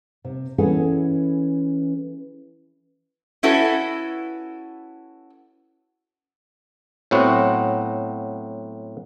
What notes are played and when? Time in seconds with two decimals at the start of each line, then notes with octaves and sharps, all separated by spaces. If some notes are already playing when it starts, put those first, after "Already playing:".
0.25 C3
0.58 E3 C#4 E4 G#4 A4 F#5
3.43 C#4 E4 F#4 A4 B4
7.11 A2 F#3 B3 C4 F#4